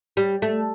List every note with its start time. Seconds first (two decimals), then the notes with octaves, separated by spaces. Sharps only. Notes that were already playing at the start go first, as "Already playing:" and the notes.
0.17 G3
0.42 A3